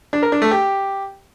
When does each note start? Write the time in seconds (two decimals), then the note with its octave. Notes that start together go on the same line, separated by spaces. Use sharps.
0.13 D4
0.23 A#4
0.32 D4
0.42 A3
0.51 G4